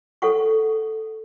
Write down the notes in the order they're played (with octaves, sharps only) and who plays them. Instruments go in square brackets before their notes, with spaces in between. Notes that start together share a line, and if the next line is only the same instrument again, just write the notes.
[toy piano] A4 C#5 F#5 C#6